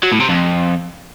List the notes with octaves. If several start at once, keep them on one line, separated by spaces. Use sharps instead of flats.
F#3
A2
C3
F2